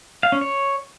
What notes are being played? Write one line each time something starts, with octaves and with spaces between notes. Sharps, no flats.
F5
C#4
C#5